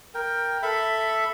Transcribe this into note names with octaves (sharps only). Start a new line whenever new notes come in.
A#4 G5
A4 E5 B5